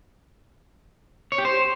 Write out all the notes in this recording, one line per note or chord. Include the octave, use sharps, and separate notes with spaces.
C#5
G4
C5